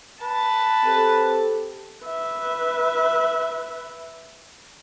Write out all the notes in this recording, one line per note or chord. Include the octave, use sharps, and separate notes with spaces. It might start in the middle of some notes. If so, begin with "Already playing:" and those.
B4 A5
C4 G4 A4
B4 E5